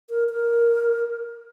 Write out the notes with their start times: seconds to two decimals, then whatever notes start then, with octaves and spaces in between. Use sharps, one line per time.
0.10 A#4
0.30 A#4